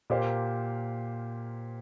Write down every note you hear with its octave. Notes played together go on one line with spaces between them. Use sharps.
A#2 A#3 G4 C5 F5